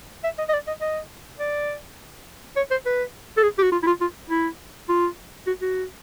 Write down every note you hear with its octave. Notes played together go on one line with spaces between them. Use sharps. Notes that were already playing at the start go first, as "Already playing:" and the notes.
E5
D#5
D#5
D5
D#5
D#5
D5
C#5
C5
B4
A4
G#4
G4
F#4
F4
E4
F4
F4
E4
F4
F#4
F#4